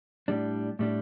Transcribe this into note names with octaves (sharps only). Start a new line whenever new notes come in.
A2 G3 D4
A2 G3 D4